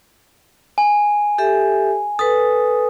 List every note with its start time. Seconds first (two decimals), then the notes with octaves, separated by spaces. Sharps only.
0.78 G#5
1.38 G4 A4 E5
2.19 A4 B4 D#6